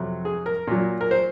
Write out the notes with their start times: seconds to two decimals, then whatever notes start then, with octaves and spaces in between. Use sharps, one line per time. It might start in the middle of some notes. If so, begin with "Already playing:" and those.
Already playing: F2 C3 F#3
0.25 G#4
0.46 A#4
0.67 A#2 F#3
1.01 A#4
1.11 C5